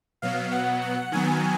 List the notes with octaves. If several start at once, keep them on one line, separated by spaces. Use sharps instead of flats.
B2 F#3 B3 F5
F#5
F#5
D#3 F#3 B3 G#5